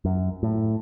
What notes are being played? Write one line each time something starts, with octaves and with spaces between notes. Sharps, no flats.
F#2
A2